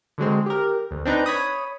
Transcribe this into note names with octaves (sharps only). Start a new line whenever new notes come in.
D3 F#3 G#3 C4
G4 A#4
D2
C4 D4 D#4 B4 A#5
C#5 B5 D#6